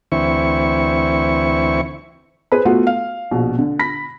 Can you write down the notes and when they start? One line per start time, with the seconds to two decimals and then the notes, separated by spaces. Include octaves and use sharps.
0.12 D2 E3 C4 E4 C#6
2.52 G#4 B4 C5 B5
2.65 A3 B3 F4 F#4
2.87 F5
3.31 A#1 B2
3.58 D3
3.79 B5 A#6 B6